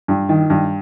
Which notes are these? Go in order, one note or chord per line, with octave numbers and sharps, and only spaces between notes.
G2
D#3
G2